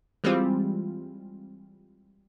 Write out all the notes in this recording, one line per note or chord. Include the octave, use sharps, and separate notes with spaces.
E3 G3 G#3 C4 F4